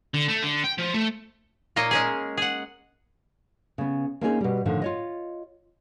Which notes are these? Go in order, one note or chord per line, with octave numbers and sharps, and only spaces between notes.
D3
A3
D3
G5
F3
A3
A#2 A#3 C#5 D#5
G#3 C#4 G#4
G#4 F#5
C#3 B3
A#3 C4 C#4 D#4 E4 G#4
B2 G3
A2 D3 D#3 F3
F4 C#5 D#5